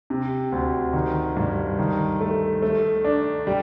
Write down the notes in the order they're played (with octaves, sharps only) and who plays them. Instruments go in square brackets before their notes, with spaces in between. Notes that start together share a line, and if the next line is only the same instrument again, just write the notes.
[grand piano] C3
D2
D#3
G2
D#3
A3
A3
D4
G3